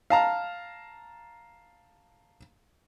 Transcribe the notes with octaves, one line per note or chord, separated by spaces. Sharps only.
F5 A5 A#5